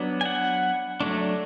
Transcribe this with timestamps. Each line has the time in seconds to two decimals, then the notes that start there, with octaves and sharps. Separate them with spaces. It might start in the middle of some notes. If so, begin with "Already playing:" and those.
Already playing: F#3 B3 D4
0.21 G#5
0.25 F#5
1.00 F#3 A3 D4